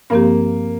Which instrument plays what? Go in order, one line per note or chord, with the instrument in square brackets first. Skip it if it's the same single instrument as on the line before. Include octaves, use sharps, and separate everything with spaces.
[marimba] G2 F3 C4 G4 [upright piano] A#3